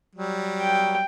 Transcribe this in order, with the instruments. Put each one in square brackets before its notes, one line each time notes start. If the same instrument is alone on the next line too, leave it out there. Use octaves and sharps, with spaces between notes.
[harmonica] F#3 G3
[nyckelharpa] G5